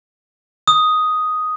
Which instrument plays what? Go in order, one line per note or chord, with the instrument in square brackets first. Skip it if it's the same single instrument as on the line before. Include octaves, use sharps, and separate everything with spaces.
[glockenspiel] D#6